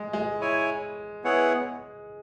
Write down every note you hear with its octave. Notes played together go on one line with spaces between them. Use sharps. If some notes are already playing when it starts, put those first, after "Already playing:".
Already playing: G#3
G#3
E4 C#5 G#5
B3 E4 G#4 C#5 F#5